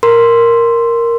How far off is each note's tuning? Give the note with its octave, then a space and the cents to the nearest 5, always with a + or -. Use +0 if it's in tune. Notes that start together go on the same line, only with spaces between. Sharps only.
A#4 +0 C6 +0